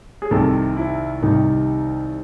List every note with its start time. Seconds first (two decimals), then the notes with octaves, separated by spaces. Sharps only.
0.22 G#4
0.31 C2 C3 D#3 A4
0.77 E4
1.22 C2 C3 D#3 D#4